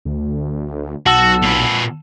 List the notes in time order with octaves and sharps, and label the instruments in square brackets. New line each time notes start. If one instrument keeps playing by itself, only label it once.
[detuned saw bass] D2
[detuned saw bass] B1 [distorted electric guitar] F#4 [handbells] F#5 A5 E6
[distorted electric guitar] A#2 B4